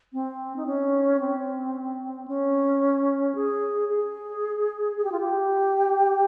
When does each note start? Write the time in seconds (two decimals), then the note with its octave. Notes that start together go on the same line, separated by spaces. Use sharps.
0.13 C4
0.56 D#4
0.66 C#4
1.20 C4
2.28 C#4
3.35 G#4
3.89 G#4
4.96 G#4
5.04 G4
5.12 F4
5.20 G4